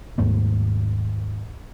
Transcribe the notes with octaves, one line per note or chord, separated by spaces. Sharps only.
D#2 G#2 A3 A#3